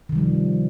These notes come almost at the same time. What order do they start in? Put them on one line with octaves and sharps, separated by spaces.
D#3 C3 G3 F3